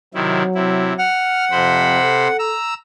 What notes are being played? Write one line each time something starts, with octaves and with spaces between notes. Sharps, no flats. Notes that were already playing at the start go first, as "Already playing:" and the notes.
C3 D#3 F#3 E4
C3 E4
F#5 F6
F2 C3 C5 B5
A4
A#5 E6